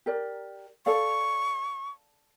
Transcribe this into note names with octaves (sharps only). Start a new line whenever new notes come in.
G4 A#4 D5
A4 D5 F5 C#6